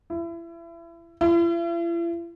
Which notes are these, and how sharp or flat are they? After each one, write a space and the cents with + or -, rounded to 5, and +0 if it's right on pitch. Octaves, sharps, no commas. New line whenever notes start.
E4 +30
E4 +45